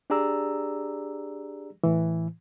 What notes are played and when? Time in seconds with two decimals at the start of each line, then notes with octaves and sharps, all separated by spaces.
0.10 D4 G4 G#4 D5 A#5 E6
1.83 A2 E3